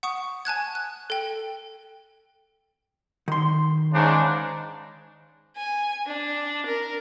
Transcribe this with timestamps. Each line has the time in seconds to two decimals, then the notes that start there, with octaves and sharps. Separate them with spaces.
0.03 F#5 C#6 D#6
0.45 G#5 A5 F#6 G#6
0.75 F#6
1.10 A4 G5
3.28 D#3 C6
3.93 G#2 C#3 D4
5.58 G#5
6.06 D4
6.67 A#4